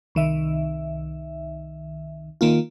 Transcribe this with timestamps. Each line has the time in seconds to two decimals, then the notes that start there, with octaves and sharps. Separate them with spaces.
0.15 C2 D#3 E5
2.41 D#3 A#3 F4